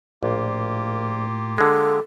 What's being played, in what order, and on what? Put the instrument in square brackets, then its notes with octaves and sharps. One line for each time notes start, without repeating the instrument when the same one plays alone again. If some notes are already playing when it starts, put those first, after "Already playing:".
[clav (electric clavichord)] A#1 [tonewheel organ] A2 [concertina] A#3 F4 G4
[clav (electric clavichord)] D3 G#3 [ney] A4